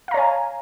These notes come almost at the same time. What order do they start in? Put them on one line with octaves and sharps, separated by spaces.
F5 A#5 C#5 G#5